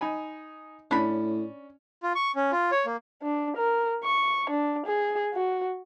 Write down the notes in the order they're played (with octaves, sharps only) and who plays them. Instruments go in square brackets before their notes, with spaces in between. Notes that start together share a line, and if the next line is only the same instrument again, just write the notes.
[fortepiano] D#4 G#5 B5
[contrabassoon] A2 [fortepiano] C#4 D5 [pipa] D4 B5
[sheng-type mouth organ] F4
C#6
C#4
F4
C#5
A#3
[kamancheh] D4
A#4
C#6
D4
G#4
F#4